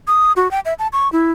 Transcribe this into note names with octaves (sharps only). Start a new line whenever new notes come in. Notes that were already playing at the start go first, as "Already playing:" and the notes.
D#6
F#4
G5
E5
A5
C#6
E4